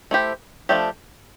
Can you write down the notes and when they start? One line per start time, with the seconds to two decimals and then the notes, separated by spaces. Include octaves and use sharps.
0.11 A3 E4 G4 C5
0.69 F3 A3 D4 G4